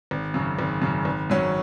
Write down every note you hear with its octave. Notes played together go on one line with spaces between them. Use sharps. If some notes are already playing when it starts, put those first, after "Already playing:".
G#1
F#2 C#3
G#1
F#2 C#3
G#1
F#2 F#3 C#4